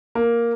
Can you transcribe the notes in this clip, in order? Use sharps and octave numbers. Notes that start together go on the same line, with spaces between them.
A#3